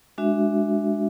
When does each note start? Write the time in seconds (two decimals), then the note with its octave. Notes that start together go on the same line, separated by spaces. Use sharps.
0.18 G#3 D4 F#4 E5